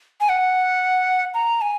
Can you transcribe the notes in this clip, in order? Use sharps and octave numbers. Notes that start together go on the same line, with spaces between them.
G#5
F#5
A#5
G#5